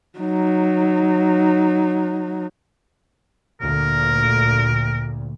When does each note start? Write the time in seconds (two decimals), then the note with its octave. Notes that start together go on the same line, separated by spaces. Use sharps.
0.19 F#3 D#4
3.61 D2 A#2 A#4